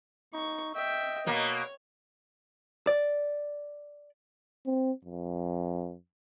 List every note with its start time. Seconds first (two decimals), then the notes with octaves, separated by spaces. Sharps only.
0.34 D#4 C#6
0.75 D#5 E5 G5
1.27 B2 A#3 C#5
2.87 D5
4.66 C4
5.05 F2